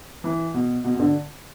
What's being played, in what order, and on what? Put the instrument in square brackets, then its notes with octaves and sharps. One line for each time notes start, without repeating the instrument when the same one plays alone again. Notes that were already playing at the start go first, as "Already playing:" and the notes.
[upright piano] E3
B2
B2
B2
D3